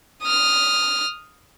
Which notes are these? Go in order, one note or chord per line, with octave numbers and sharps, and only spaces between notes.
D#6 F6